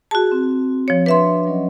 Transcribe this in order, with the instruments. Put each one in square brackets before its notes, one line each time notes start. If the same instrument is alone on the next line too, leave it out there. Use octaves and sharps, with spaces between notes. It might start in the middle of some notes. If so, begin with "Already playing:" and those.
[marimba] F#4 A5 [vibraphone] G#4
[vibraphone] C4
[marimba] F3 C#5
[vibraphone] D4 [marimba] B4 E5 C6
[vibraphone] F#3 C#4 D#5